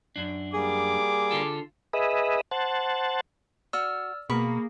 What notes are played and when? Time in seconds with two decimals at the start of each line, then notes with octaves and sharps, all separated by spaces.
0.16 F#2 D4
0.54 G3 A#3 G#4 D6
1.31 D3 F4 A4
1.93 G#4 B4 D#5 E5
2.51 C5 F#5 A5
3.73 F#4 D5 C#6 E6 F6
4.30 B2 A#3 G#4 A#4 B5 C#6